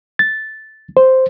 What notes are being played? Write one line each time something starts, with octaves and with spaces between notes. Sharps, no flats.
A6
C5